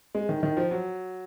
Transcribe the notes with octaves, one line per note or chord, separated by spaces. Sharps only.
G#3
D#3
D#3
F3
F#3